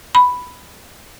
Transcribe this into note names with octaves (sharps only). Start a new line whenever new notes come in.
B5